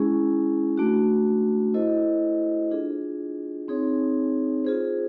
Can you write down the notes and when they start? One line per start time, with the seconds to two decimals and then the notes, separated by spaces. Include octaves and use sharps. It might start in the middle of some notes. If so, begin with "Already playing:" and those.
Already playing: G#3 C#4 E4 G#4
0.78 A3 D4 F#4
1.74 E4 A4 C5 D#5
2.71 D4 F4 G#4
3.68 C4 D#4 G#4 C#5
4.64 F4 G#4 C5